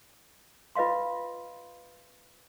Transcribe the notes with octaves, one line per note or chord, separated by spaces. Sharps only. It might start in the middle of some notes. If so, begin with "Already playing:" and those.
F4 B4 D#5 F5 C6